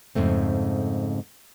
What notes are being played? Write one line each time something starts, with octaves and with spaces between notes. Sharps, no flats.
F2 G#2 C#3 A3 C4